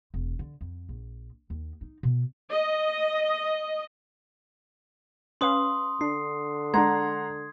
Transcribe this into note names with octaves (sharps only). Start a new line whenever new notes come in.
E1
D3
F2
A#1
D#2
D#4
B2
D#5
C#4 B4 F5 C6 D#6
D3 D4 C7
G#3 D4 F#5 A#5 C6 G#6